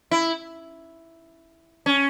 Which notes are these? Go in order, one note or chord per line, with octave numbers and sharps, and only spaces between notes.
E4
C#4